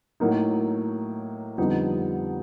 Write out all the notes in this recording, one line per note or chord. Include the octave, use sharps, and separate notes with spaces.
A2 F#3 A#3 D#4
F2 D3 G3 B3 D#4